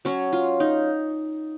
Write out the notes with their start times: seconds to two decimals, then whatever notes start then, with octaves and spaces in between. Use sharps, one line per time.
0.05 F#3 C#4 C#5
0.33 F4
0.60 D#4